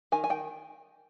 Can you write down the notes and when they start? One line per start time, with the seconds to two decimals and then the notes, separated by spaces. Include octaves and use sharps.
0.12 D#3 G#5
0.24 G#5
0.30 D#3 G5